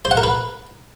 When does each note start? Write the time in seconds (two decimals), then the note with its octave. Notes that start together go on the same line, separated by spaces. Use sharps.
0.05 C5
0.11 F#5
0.17 A#4
0.23 B4